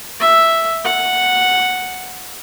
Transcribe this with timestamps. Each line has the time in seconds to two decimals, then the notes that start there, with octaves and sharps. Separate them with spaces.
0.21 E5
0.85 F#5